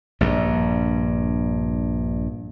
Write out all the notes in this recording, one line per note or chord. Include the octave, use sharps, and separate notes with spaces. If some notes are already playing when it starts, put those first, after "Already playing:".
A#1 G2